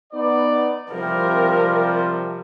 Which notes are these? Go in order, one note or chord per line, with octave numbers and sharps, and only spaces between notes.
B3 D#4 D5
C3 F3 G3 A#4